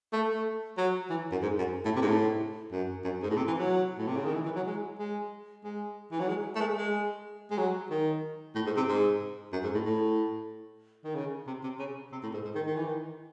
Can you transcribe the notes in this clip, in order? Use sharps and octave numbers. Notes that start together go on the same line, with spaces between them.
A3
A3
F#3
E3
F#2
G#2
F#2
A2
C3
G#2
A2
F#2
F#2
G#2
A2
C3
E3
F#3
A2
C3
C#3
D#3
E3
E3
F#3
G#3
G#3
G#3
E3
F#3
G#3
A3
G#3
G#3
G#3
F#3
D#3
A2
G#2
C3
G#2
F#2
G#2
A2
A2
D#3
C#3
C3
C3
C#3
C3
A2
G#2
G#2
D#3
D#3
E3
D#3